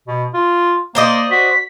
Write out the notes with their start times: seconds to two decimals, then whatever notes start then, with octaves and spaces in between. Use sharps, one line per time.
0.08 B2
0.34 F4
0.95 A#3 C5 D5 D#5
1.31 F#4 B6